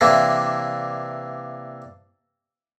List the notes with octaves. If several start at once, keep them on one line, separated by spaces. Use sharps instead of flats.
C3 E3 A#3 D4 E4